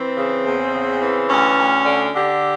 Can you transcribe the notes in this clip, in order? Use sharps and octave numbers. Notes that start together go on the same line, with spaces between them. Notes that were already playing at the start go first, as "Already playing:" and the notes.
Already playing: E3 C4
C#3
E2
C#3
E3
D2 C#4
D2
D3
D3 G4